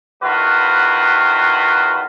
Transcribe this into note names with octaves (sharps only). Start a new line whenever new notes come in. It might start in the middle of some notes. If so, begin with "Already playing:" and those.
E2 D#3 F4 F#4 B4